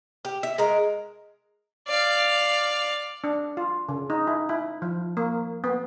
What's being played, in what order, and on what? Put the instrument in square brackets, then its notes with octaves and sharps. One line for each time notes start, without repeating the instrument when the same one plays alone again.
[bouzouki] G4
E5
G#3 A#4
[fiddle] D5 F5
[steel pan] D4
F4
C#3
D#4
E4
E4
F3
A#3
B3